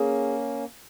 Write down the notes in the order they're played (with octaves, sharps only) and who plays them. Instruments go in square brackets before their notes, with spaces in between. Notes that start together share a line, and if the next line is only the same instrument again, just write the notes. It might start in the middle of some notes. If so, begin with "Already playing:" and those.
Already playing: [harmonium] A#3 C#4 [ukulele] G#4